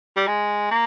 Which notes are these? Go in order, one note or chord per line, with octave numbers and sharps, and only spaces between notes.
G3
G#3
A#3